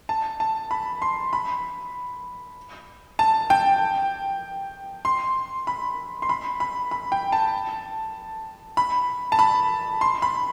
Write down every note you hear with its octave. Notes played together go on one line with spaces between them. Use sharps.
A5
A5
B5
C6
B5
A5
G5
C6
B5
C6
B5
B5
B5
G5
A5
B5
A5
B5
C6
B5